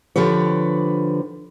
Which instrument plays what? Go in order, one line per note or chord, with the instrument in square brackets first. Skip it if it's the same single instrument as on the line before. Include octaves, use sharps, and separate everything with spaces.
[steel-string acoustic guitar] D3 F3 G4 B4 C#5